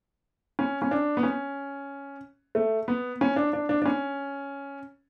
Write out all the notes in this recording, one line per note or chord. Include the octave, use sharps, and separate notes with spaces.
C#4
C#4
D4
B3
C#4
A3
B3
C#4
D4
D4
D4
D4
C#4